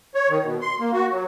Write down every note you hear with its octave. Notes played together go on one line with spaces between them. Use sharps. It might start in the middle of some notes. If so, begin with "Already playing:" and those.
C#5
D#3
B2
C6
A#3
F#4
F#3